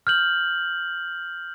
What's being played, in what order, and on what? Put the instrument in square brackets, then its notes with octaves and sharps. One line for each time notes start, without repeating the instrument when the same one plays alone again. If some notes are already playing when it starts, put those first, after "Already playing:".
[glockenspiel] F6 G6 F#7